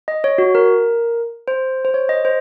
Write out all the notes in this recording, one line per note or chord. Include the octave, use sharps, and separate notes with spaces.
D#5
C#5
F#4
A#4
C5
C5
C#5
D#5
C5